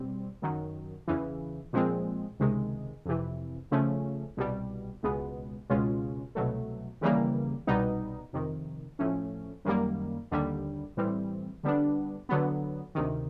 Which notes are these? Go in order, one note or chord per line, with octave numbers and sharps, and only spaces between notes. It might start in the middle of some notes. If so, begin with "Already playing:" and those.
Already playing: B2 G3 C4
F#2 D#3 F#3
E2 C#3 E3
A#2 F3 G#3 C4
C#2 C3 D#3 G#3
F2 C3 E3
C#3 F3 A3 C#4
C2 B2 G3
C#2 B2 G#3 B3
C#2 B2 G#3 C#4 F4
C2 B2 F#3 A3
D#2 C#3 E3 G3 A#3
C2 B2 G3 B3 D#4
F2 C3 D#3
A2 F3 A3 C#4
F#2 D#3 G3 A#3
D#2 D3 G3
A2 E3 G3 C4
D3 G3 B3 D4
D3 F#3 B3
D2 C3 D#3